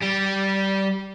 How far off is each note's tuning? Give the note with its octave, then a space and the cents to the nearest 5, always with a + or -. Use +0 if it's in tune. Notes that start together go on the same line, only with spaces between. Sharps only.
G3 -15